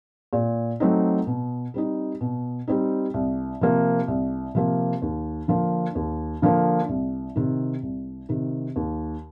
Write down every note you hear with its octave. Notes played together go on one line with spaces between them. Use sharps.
A#2
F#3 A3 C4 D#4
B2
G3 C4 D#4
B2
G3 C4 D#4
C2
C3 F3 A#3
C2
C3 F3 A#3
D#2
D3 F3 A#3
D#2
D3 F3 A#3
C2
C3 D#3
C2
C3 D#3
D#2